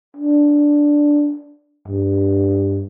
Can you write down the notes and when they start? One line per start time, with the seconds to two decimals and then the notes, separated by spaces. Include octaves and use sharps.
0.16 D4
1.88 G2